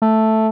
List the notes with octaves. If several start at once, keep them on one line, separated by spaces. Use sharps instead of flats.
A3